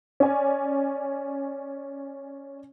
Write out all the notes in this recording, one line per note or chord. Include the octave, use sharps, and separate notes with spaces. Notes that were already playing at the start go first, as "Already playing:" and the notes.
C#4 D5 G#5